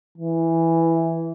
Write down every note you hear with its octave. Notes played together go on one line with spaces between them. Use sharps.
E3